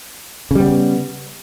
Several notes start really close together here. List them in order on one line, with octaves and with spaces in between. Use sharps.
C#3 G3 B3